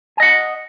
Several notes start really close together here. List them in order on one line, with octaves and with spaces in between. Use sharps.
G#5 D#5 F#5